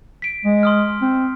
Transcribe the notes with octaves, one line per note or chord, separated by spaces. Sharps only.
B6 D7
G#3
C6 D#6 F6
C4